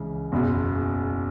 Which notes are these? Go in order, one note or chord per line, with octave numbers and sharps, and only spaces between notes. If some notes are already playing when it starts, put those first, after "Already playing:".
Already playing: C#2 C#3 E3
F#1 E2 B2